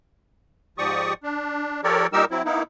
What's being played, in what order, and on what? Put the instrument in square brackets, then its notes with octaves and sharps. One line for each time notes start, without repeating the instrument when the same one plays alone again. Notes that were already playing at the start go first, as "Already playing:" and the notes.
[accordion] G#2 F3 G4 D5 C#6 D#6
D4
F3 G4 A4 A#4 C#5 D5
A#2 G3 D#4 G4 A#4 E6
F#3 C4 E4
A#3 B3 D#4 E4